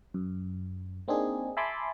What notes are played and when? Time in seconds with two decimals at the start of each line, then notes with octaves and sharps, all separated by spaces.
0.14 F#2
1.08 A#3 C4 D4 D#4 G#4
1.57 E5 G#5 A5 B5 C6 D6